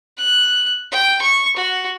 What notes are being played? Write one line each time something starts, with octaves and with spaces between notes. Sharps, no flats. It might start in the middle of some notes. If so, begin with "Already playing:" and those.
F#6
G5
C#6
F#4